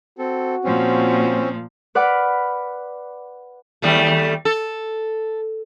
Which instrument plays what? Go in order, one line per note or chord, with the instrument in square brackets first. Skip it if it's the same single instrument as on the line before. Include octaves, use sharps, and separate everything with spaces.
[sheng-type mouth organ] C4 A4 [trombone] F#4
[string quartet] A#2 F3 [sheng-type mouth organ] C4 C#4
[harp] B4 D5 F#5 B5 D6 F6
[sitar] D#2 G3 A3
A4